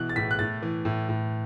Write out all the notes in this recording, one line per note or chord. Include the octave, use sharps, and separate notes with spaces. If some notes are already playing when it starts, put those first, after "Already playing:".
Already playing: B2 E3 F#6
A6
A2 B6
F#6
A2 A6
E3
A2
A2